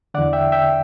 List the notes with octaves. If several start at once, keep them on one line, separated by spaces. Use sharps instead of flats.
E2 D3 D5 F#5
E5 G5
E5 G5